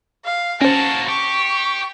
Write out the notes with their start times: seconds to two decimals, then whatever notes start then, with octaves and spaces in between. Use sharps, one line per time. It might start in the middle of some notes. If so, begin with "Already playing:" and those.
0.25 F5
0.62 A#3 C#4 F#4 C5 A5
1.08 G4 C#6